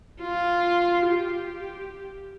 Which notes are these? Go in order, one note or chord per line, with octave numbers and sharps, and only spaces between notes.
F4
G4